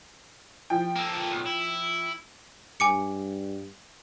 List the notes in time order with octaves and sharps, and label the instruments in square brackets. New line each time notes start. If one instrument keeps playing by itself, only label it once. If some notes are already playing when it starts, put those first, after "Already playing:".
[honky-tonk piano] F3 G5
[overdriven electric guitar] A#3 A4
B1
E4
[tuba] G2 [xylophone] G#5 D6 C#7